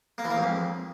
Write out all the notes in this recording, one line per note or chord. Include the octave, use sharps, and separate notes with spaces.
A#3
E3
A#3
G#2
F2